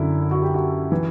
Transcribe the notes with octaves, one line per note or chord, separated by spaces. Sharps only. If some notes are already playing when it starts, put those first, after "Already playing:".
Already playing: F#2 D3 E4
F#4
G4
F#4
E3